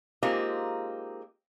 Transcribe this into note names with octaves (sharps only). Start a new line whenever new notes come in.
G#3 A#3 C4 D#4 F4 G4